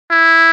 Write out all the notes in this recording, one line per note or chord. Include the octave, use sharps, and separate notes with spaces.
E4